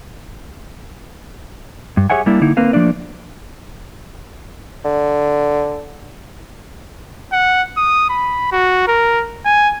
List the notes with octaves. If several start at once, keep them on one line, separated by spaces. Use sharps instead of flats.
G2
G4 G#4 C#5 E5 F#5 G#5
G3 A#3 D4 E4
D3 A#3 D#4 E4
A#3 C4 A#4 B4 F5
F3 A3 A#3 D4 D5
D3
F#5
D#6
B5
F#4
A#4
G#5